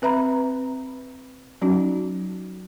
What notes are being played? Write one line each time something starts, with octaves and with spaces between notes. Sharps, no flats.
C4 B4 E5 A#5 B5
F#3 C#4 D#4 F#4